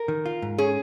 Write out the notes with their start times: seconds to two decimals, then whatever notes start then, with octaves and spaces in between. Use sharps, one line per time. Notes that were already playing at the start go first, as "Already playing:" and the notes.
Already playing: A#4
0.08 D#3
0.26 F4
0.42 G#2
0.58 C#4 G#4